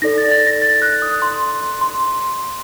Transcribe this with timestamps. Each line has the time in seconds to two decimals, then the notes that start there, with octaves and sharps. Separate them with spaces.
0.02 D#4 A4 D5 A#6
0.18 A6
0.32 A6
0.47 A#6
0.62 A6
0.82 F#6
1.02 D#6
1.22 C6
1.81 C6